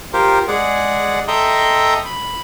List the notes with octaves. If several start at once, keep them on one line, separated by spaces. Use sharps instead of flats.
F4 G4 A#4 C5
G#3 G#4 D5 F#5
A4 D#5 E5 G5 A#5 C6
B5